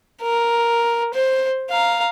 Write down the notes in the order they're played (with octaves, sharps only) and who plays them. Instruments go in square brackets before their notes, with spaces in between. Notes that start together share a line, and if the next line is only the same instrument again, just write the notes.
[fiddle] A#4
C5
F5 A#5